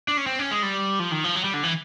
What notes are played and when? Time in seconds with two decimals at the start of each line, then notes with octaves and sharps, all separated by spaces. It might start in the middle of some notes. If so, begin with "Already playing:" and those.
0.08 D4
0.17 C#4
0.27 C4
0.39 C#4
0.51 G#3
0.63 G3
1.00 F3
1.12 D#3
1.24 F3
1.36 F#3
1.44 G3
1.54 D3
1.63 E3